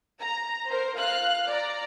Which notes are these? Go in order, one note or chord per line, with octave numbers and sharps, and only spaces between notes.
A#5
A#4 C5
F4 F5 F6 F#6
D5 A#5